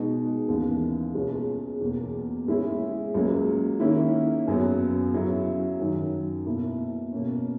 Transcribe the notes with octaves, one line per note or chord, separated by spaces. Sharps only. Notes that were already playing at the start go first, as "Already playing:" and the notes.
Already playing: B2 G#3 D#4 F#4
D#2 C#3 E3 B3
C#2 B2 G#3 C#4
E2 B2 A#3
C#3 G#3 C#4 E4
C#2 C#3 F#3 A#3
D#3 A#3 C#4 E4
F#2 C#3 F#3 B3
C#3 F#3 C#4 E4
F#2 D#3 F#3
B2 A#3 E4
B2 A#3 C#4